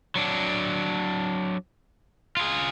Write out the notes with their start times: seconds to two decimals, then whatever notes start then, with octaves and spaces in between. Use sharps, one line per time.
0.16 F#3 D4
2.37 F4 G#4